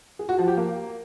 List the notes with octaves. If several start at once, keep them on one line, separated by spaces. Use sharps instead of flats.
G#4
F#4
F3
G4
A#3